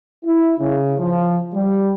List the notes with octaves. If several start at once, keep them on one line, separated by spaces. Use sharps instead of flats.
E4
C#3
F3
G3